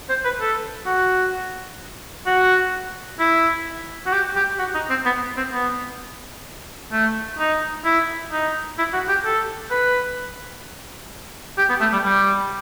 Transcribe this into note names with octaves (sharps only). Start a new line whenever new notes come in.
C5
B4
A4
F#4
F#4
E4
F#4
G4
G4
F#4
D#4
C4
B3
C4
B3
A3
D#4
E4
D#4
E4
F#4
G4
A4
B4
G4
B3
A3
G3
G3